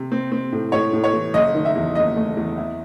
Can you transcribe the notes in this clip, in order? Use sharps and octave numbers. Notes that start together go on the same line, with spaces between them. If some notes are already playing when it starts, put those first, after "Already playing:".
Already playing: C3
C4
C4
A2
A2 C#5
A2
C#5
E3
F#1 D#5
D#3
E5
E2
F#1 D#5
A3
E2
E4